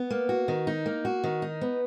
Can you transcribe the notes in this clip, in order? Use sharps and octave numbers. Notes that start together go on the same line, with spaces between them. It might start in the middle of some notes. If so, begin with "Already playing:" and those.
Already playing: B3
A#3
F#4
D#3
D#4
A#3
F#4
D#3
D#4
B3